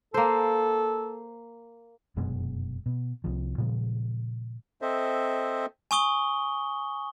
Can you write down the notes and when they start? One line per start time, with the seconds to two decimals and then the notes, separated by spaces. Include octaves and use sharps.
0.14 A#3 A4 C5
2.16 F1 F#2 B2 G#3
2.86 B2
3.24 C2 C3 F3
3.58 A#2 C#3 F3 G#3
4.82 C4 A4 C5 D#5 E5
5.91 G#5 C#6 D#6 G7